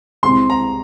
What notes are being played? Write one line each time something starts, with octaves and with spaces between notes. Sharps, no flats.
C2 C3 G#3 C4 C6
A#5